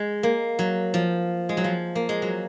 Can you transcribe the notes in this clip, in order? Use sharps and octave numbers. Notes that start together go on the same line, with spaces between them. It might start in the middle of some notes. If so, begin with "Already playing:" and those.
Already playing: G#3
A#3
F#3
F3
G#3
F#3
F3
A#3
G#3
F#3